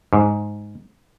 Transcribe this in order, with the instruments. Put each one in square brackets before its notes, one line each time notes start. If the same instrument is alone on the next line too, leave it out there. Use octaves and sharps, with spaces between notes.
[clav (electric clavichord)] G#2